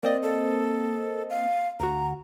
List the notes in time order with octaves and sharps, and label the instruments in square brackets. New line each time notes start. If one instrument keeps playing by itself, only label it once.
[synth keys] A#3 C4 D#5 [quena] D5
[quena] A4
F5
[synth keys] D2 F#4 [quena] A#5